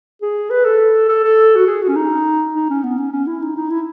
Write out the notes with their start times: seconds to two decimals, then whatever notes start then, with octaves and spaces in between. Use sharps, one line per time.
0.22 G#4
0.50 B4
0.65 A4
1.09 A4
1.24 A4
1.56 F#4
1.67 G#4
1.82 F#4
1.89 C#4
1.96 D#4
2.55 D#4
2.70 C#4
2.84 B3
2.98 C#4
3.12 C#4
3.27 E4
3.42 D#4
3.57 D#4
3.70 E4